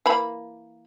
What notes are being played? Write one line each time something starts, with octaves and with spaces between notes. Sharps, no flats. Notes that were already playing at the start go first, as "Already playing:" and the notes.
E3 A#3 B5